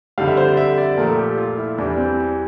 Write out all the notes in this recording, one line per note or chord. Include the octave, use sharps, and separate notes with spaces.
F2 D3 G3 F5
E5
C5
D5
E5
D5
A#2 F3 A3 A#4
G4
F4
E4
E2 E3 G3 D4
C4